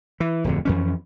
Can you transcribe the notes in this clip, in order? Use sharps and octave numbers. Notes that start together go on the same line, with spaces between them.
E3
D1 F2 D3
F2 E3 C#4